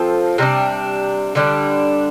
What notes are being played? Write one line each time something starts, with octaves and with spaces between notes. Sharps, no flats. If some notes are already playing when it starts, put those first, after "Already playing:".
Already playing: F3 C4 F4 A4
C3 G3 D4
D3 G3 D4